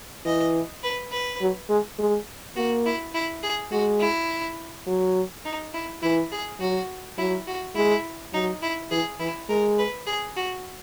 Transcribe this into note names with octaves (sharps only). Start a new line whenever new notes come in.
E3 D#5
B4
B4
F#3
G#3
G#3
A#3 F#4
E4
E4
G#4
G#3 F#4
E4
F#3
D#4
E4
E3 E4
G#4
F#3 F#4
F#3 E4
F#4
G#3 E4
F#3 D#4
E4
E3 G#4
E3 E4
G#3 A#4
B4
G#4
F#4